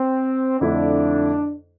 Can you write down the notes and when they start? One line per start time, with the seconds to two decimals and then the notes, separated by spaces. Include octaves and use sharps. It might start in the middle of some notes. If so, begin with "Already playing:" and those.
Already playing: C4
0.60 F2 D3 F3 A3 D4 E4